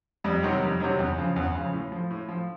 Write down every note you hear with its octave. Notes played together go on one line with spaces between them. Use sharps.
F2 G3
C3 D#3 F#3
F2
C3 D#3 F#3
E2
C#3 F3
E2
C#3 F3
A2
F3
A2
F3